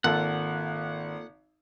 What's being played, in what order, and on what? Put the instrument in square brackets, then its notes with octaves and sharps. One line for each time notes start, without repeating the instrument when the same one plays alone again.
[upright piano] G#1 [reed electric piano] A#3 F4 A4 [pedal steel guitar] F#5